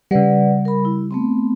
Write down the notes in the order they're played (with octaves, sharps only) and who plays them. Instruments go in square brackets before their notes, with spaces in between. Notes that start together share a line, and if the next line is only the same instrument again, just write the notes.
[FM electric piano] C#3 G3 [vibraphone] B4 D5 F#5
[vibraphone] A#4 B5
E4
A3 B3 C4